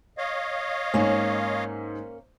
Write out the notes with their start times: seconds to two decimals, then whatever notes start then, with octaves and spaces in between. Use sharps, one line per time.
0.18 C#5 D#5 F5
0.94 G#2 A#3 C#4